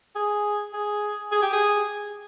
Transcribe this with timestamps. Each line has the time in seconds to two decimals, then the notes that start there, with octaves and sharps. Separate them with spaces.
0.16 G#4
0.73 G#4
1.32 G#4
1.42 G4
1.53 G#4